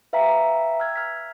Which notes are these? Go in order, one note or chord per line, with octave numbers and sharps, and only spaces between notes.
B4 E5 F5 G5 A#5 B6
E6 F6 G#6
F6 B6